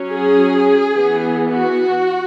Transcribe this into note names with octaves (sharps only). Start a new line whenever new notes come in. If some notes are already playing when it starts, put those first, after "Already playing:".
Already playing: F#3 C#4
G#4
E3 B3
F#4